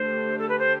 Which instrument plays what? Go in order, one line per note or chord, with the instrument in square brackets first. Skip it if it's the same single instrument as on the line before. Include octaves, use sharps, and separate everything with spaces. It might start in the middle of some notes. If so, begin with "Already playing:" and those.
Already playing: [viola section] D3 A3 D4 G4 [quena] C5
[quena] A4
B4
C5